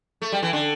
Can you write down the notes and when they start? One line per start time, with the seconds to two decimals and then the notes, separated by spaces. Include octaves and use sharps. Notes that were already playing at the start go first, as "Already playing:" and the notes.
0.22 A3
0.32 G3
0.42 E3
0.53 D3